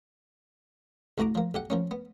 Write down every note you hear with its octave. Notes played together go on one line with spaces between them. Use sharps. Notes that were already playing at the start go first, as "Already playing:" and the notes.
C2 A3 F#4 A#5 D6
F3 A#3
B1 G4 F#5
F3 A#3 C#4
B3